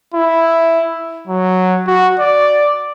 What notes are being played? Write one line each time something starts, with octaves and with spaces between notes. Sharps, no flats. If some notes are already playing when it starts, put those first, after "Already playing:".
E4
F#3
F#4
D5